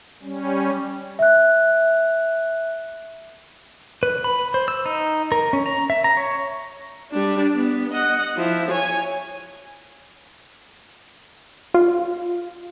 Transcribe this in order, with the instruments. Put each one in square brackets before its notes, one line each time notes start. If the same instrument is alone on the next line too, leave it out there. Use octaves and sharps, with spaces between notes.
[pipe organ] G3 C#4
[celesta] E5 F#6
[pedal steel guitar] B4
B5
C5
E6
D#4
A#4
C#4
A#5
E5
A#5
C#5
[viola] G3 D4
B3
D#5 F#5
F3 E4
C#5 G#5
[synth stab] F4